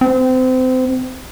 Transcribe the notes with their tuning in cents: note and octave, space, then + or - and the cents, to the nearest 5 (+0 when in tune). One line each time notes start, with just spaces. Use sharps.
C4 -30